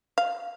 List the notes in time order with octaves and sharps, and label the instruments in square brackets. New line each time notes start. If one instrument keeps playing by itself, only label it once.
[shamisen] F5